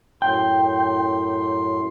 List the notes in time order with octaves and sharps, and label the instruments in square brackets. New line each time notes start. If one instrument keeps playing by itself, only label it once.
[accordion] F#2 A2 C6 [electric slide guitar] G5